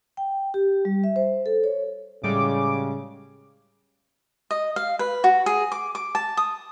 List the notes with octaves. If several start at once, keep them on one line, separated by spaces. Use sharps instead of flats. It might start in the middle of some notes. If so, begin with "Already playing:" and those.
G5
G4
G3
E5
C5
A4
C#5
A2 C#3 G3 G#3 D6
D#5
F5
B4
F#4
G#4
D6
D6
A5
D#6